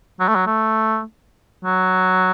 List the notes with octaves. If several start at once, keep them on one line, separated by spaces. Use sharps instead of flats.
F#3
A3
F#3
A3
F#3